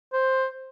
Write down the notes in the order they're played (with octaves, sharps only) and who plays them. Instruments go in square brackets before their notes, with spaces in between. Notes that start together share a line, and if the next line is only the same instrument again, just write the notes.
[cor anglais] C5